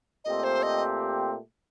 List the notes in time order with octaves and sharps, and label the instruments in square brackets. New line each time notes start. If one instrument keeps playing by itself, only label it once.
[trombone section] A#2 A3 C4 G4 [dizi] D#5
[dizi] C5
D#5